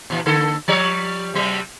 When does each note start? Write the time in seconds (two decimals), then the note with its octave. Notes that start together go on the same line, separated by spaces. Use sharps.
0.10 A#2 E3
0.26 D3 A#3 A4
0.68 F3 G3 C#5
1.34 C3 F#3 G3